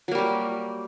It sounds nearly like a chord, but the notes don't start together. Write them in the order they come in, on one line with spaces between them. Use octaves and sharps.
F#3 A#3 G3 G4